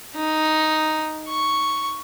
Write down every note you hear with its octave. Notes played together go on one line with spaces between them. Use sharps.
D#4
C#6